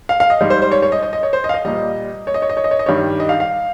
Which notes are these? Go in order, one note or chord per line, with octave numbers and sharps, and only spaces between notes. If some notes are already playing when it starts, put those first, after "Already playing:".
F5
F5
D#5
G#2 G3
C5
C5
C#5
C#5
D#5
D#5
D#5
C#5
C5
D#5
F5
D#5
A#2 G3 D#5
C#5
D#5
C#5
D#5
C#5
D#5
C#5
D#5
G2 D#3 G3 C#5
D#5
F5
F5